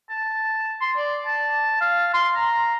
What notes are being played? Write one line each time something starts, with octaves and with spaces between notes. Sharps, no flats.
A5
C6
D5
A5
F5
C6
A#5